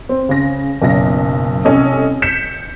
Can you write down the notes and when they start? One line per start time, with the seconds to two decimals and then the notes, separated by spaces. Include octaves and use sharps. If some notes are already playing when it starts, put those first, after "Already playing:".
0.09 C4
0.29 C#3 A#6
0.82 F#1 B1 A#6
1.65 C2 C#4 A4 D#5
2.22 G6 B6 C#7 E7